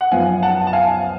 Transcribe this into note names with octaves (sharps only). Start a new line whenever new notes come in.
F#5
F#2 F3 B3 F5 G#5
F#5 A5
A5
F5 G#5